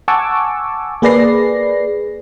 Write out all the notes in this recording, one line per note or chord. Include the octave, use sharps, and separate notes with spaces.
F#5 G#5 A5 C#6 D6 E6
A#3 G#4 B4 D5 A#6 C7